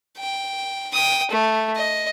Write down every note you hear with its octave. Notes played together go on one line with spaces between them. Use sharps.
G5
G5 D#6
A3
D#5